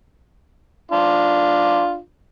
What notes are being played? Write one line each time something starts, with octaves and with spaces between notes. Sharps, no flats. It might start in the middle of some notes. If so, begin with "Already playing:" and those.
D4 F4